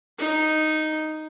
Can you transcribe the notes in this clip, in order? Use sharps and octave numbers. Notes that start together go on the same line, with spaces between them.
D#4